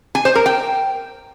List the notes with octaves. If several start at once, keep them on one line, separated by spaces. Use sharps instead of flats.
G#5
C5
A#4
G5